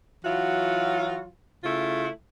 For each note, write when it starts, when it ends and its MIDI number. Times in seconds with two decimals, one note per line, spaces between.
0.24 1.27 52
0.24 1.27 54
0.24 1.27 65
0.24 1.27 66
1.63 2.08 49
1.63 2.08 57
1.63 2.08 64
1.63 2.08 65